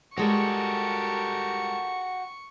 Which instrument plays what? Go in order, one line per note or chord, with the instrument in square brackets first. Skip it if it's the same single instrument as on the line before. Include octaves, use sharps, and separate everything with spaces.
[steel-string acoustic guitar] G3 G#3 C#5 [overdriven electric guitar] F#4 G4 [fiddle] A4 A#4 [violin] C#6